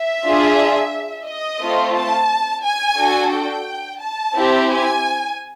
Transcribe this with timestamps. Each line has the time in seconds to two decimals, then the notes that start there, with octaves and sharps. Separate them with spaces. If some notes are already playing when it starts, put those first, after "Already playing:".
Already playing: E5
0.24 D4 F4 G#4
1.26 D#5
1.61 A3 C4 F4
1.95 A5
2.64 G#5
2.98 D4 F#4 A4
3.32 G5
4.01 A5
4.35 C4 E4 G4
4.69 G#5